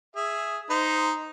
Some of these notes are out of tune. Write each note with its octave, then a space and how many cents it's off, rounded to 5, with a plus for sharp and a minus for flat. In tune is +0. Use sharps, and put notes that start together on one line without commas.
G#4 +0 E5 +10
D#4 +0 C5 -15